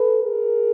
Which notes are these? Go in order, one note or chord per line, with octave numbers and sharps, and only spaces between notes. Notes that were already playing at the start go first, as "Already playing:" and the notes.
Already playing: A4 B4
G#4 A#4